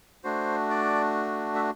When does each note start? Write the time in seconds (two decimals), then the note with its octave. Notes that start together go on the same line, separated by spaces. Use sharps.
0.24 A3 D4 F#4 C5
0.70 D5
1.55 E5